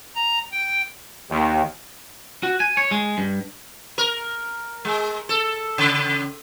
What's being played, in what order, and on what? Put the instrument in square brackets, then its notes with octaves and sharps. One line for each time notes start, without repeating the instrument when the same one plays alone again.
[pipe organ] A#5
G5
[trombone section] D#2
[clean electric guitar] F#4
G#5
C#5
G#3
G2
[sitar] A#4
G#3
A4
C#3